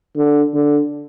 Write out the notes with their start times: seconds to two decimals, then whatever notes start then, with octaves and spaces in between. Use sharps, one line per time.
0.16 D3
0.54 D3